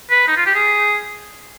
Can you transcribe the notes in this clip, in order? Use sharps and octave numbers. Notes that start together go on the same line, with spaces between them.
B4
D#4
F4
G4
G#4